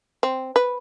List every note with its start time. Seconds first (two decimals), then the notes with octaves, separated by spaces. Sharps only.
0.23 C4
0.56 B4